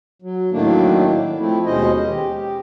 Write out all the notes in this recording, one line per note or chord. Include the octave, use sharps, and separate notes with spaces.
F#3
A2 D#3 F#3 A3 A#3 D4
F3 A3 C4 E4
D#2 B2 G#3 C#4 C5 D#5
G4
G4